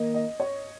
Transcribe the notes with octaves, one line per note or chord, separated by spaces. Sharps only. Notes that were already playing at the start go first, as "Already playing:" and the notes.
Already playing: D#3 A#3 D#5
D#5
C#5